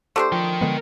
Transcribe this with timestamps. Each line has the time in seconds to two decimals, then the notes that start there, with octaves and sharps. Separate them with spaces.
0.16 A3 D4 G4 A4 C5 C6
0.32 F3 A#4 G5
0.61 D3 G#3 B3